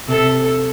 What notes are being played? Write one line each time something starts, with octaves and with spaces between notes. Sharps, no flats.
C3 A4